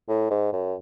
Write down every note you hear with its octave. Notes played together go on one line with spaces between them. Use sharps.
A2
G#2
F#2